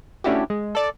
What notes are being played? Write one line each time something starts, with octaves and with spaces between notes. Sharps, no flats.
A3 C#4 D4 E4 F#4 G4
G#3
A4 D5